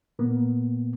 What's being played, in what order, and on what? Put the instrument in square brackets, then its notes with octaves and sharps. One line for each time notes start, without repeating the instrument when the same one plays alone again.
[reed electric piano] A#2 A#3 B3